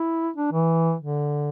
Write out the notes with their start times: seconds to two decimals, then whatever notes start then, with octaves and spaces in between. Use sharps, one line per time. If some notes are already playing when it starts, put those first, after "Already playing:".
Already playing: E4
0.36 D4
0.52 E3
1.00 D3